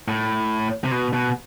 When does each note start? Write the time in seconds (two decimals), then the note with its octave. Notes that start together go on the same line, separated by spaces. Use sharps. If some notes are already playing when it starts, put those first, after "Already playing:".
0.08 A2
0.84 C3
0.91 B2
1.13 B2